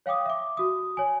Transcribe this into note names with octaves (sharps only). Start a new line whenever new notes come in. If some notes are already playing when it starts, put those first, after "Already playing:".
C#5 F5 G5 D6 D#6
E5 D6
F#4 D#6
C#5 G#5